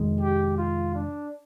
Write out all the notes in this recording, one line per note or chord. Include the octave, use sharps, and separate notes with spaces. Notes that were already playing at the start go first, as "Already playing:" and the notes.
Already playing: F2 C3 D#3 G#3
G4
F4
D4